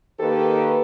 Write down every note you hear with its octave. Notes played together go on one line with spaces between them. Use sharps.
D#3 A#3 G4 A4 B4